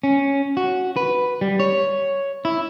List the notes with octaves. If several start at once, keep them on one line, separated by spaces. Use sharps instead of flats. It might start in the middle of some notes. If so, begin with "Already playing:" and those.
C#4
F#4
B4
G3
C#5
E4